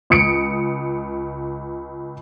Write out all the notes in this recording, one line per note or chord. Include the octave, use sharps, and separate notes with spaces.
C#2 D#6 C#7 D7